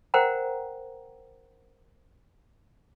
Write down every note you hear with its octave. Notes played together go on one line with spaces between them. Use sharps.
A#4 C5 F#5 G5 A#5